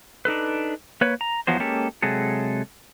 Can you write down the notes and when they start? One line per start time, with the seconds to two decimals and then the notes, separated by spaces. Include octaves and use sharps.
0.25 D4 D#4 A4 B4
1.01 A#3 B4 C#5
1.21 A#5
1.47 E2 F3 F#3 B3 C5
1.60 G#3 A#3 C#4 G4 A4
2.02 C3 F#3 G#3 G#4 A4